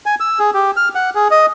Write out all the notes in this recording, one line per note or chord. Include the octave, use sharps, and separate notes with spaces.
G#5
E6
G#4
G4
F6
F#5
G#4
D#5